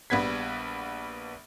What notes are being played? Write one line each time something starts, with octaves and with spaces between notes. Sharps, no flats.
A#1 G3 B3 G#6 B6